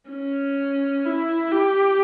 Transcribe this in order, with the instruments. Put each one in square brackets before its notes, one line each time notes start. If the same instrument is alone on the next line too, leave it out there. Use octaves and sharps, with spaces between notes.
[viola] C#4
E4
G4